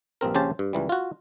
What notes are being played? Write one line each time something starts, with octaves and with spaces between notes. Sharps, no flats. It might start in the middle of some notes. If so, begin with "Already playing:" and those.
A#1 G2 C4 A#4
A#1 C#3 C#4 G4 C5 A5
G2
C#2 E3 G3
F4 F#4